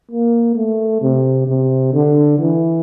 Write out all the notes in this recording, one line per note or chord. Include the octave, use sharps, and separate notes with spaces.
A#3
A3
C3
C3
D3
E3